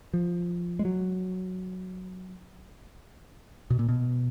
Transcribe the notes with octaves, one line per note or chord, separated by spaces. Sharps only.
F3
G#3
F#3
B2
A#2
B2